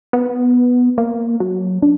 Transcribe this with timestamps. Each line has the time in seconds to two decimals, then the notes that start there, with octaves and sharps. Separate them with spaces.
0.13 B3
0.98 A#3
1.40 F#3
1.82 D4